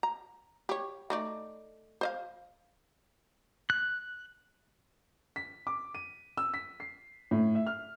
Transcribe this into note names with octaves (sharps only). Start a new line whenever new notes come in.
A#5
G4 C#5
A3 D#4 D5
C5 D#5 F5
F#6
B6
D6
D#7
E6
B6
C7
A2
E5
F6